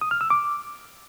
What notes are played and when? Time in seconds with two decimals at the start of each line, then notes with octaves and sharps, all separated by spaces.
0.01 D#6
0.11 F6
0.21 E6
0.30 D6